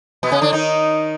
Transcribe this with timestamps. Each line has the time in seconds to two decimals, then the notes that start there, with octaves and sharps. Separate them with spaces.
0.23 B2 B3
0.32 C#3 C#4
0.41 D3 D4
0.53 D#3 D#4